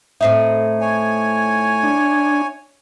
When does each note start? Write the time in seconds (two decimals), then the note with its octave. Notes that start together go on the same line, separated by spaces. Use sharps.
0.21 A2 C4 D#4 E5
0.81 C#5 G#5
1.83 D4